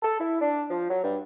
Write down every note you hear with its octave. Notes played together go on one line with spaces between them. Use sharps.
A4
E4
D4
F3
F#3
G2